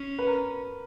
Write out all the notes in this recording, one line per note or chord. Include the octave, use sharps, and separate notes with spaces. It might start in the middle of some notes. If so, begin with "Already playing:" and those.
Already playing: C#4
B4
A#4